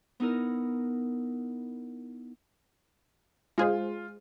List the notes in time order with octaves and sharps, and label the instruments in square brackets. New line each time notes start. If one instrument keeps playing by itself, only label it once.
[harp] B3 D#4 E4 A#4
[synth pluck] G#3 G#4 C5 [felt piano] F4